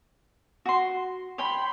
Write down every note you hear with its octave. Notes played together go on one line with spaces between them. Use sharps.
F#4 C6
C#5 G5 B5 C6